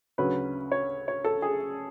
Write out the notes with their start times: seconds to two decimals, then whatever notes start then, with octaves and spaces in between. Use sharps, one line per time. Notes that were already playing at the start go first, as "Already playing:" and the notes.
0.18 D2 C#3 F#3 B4
0.72 C#5
1.08 C#5
1.24 A4
1.42 G#4